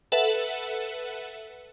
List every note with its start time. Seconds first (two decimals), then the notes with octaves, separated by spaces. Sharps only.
0.12 A4 B4 E5 F#5